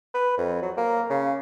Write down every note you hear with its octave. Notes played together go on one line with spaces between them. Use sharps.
B4
F2
F#3
A#3
C#3